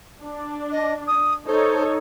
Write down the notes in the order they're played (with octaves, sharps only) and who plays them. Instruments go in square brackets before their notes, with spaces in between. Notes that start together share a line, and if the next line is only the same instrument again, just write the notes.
[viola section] D4
[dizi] D#5
D#6
[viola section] D#4 A4 C#5 [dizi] C5